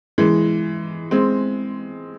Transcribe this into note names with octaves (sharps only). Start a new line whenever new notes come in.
E3 G#3
G#3 C4